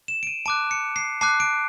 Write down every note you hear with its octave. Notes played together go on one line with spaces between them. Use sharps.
E7
D7
D#7
A5 D6 F#6 D7
C#7
C7
A5 D6 F#6 C7
D7